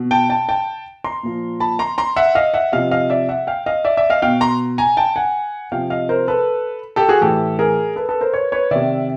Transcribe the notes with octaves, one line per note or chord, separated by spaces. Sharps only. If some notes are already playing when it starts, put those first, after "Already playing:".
Already playing: B2
G5 A5
G5 A5
G5 A5
A#5 C6
A#2 F3
A5 B5
A#5 C6
A#5 C6
E5 F#5
D#5 F5
E5 F#5
C3 F3 D#5 F5
D#5 F5
D5 E5
E5 F#5
F5 G5
D#5 F5
D5 E5
D5 E5
D#5 F5
B2 F5 G5
A#5 C6
G#5 A#5
G5 A5
F#5 G#5
C3 F3 F5 G5
D#5 F5
A#4 C5
A4 B4
G4 A4
F#4 G#4
A2 E3 G4 A4
G#4 A#4
A4 B4
A4 B4
A#4 C5
B4 C#5
B4 C#5
C3 D#3 D5 E5